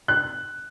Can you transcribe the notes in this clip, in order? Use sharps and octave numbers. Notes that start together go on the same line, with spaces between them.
F#6